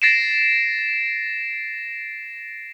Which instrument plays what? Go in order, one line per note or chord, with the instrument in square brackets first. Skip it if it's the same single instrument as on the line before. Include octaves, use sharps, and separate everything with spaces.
[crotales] A6 A#6 C7 D7 E7